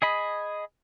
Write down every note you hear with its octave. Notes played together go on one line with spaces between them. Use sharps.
G#4 D#5 B5